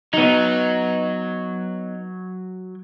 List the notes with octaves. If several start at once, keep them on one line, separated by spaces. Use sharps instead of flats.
F#3 B3 D#4